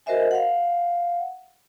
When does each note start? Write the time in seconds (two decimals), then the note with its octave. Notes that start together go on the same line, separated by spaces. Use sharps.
0.06 F#4 A#4 C5 D#5 E5 G#5
0.31 F5 F#5